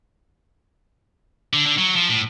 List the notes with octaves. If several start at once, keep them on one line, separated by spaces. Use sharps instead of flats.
D3
D3
F#3
F3
A2